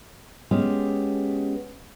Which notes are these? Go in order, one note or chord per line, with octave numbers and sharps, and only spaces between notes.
G#3 B3 C#4 G4